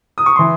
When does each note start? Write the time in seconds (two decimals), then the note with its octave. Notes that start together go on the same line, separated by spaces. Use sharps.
0.18 D#6
0.26 C#6
0.36 E3 C6